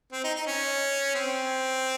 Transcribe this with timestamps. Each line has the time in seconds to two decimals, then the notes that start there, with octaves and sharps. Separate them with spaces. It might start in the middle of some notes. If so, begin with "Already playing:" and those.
0.13 C4
0.24 D#4
0.35 D#4
0.47 C#4
1.15 C4